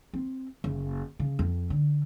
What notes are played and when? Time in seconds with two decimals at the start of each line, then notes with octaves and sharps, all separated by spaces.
0.14 C4
0.64 F#1
1.19 C#3
1.39 F2
1.70 D3